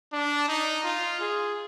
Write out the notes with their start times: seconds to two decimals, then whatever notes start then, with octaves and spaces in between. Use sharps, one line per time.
0.12 D4
0.48 D#4
0.84 F4
1.20 G#4